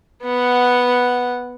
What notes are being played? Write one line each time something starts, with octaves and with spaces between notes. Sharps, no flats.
B3 F#5